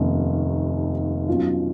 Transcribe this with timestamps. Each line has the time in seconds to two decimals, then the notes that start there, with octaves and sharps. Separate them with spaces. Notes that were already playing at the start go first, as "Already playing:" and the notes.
Already playing: F1 D#2 D#3 A#3 C#4
1.28 B1 B2 F#3 C#4 F4